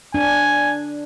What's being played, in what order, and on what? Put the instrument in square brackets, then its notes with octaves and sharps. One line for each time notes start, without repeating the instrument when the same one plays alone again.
[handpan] D4 [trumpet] G#5